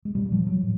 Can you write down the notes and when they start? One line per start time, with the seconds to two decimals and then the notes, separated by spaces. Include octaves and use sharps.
0.05 G#3
0.15 A#2 G3
0.32 F3
0.47 F#3
0.62 A2